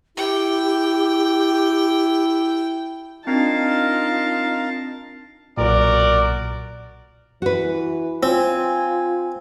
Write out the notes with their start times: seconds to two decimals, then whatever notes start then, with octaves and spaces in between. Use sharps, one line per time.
0.17 E4 G4 G5
3.27 C4 D4 D#4 F4 A#4 F5 A5
5.57 B1 A#2 F#4 A#4 D5
7.42 E3 F#4 B4
8.23 C4 F4 G#5